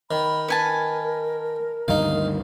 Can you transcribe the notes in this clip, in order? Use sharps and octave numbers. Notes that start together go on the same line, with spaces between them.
D#3 B5
A#4 B4 G#5 A5
D2 G2 D#3 D#4 F5